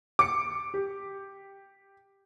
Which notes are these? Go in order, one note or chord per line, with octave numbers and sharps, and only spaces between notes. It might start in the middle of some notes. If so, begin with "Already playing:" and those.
D6 C#7
G4